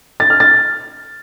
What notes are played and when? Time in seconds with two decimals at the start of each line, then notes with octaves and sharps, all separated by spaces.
0.20 A6
0.30 F6
0.40 A6